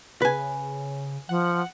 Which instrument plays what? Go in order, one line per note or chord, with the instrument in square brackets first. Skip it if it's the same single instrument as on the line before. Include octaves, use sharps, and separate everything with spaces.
[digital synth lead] C#3 [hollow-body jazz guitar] B4 G#5
[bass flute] F3 [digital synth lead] F#5